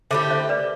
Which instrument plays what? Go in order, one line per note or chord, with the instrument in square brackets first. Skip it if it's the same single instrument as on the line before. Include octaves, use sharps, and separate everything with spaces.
[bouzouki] D3 A3 E4 G4 [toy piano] C5 E5
[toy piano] C5 E5
B4 D5